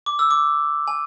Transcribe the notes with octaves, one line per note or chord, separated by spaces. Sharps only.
D6
E6
D6
G#5